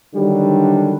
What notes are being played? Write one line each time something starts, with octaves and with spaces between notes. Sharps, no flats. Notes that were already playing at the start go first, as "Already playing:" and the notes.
D3 D#3 F#3 G3 D4